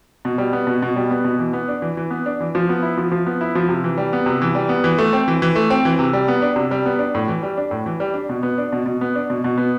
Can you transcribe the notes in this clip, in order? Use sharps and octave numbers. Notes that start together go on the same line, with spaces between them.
B2
G3
B3
B2
B2
G3
B3
B2
E3
B3
D4
E3
E3
B3
D4
E3
F3
B3
E4
F3
F3
B3
E4
F3
C3
E3
G3
B3
C3
E3
G3
B3
E3
A3
C4
E3
E3
A3
C4
E3
C3
G3
B3
D4
C3
G3
B3
D4
A2
E3
G3
D4
A2
E3
G3
D4
B2
B3
D4
B2
B2
B3
D4
B2
B2
B3